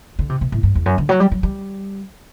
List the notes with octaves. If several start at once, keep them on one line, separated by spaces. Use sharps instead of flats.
D3
C3
B2
A2
G2
E2
F#2
D3
F#3
G3
F#3
G3